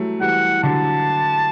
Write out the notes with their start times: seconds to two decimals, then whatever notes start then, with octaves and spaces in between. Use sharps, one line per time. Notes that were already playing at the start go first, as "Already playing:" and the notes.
Already playing: E3 F#3 G3 A3
0.21 E3 G3 F#5
0.63 D3 F#3 A5